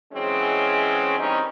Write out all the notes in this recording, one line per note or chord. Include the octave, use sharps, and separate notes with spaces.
E3 F#3 G#3 C4 C#4
D#3 E3 G3 C4 C#4 D#4